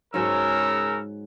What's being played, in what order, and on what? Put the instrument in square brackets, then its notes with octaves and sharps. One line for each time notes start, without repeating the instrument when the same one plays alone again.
[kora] G#2 F#3 [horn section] C#3 C#4 A#4 [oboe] E6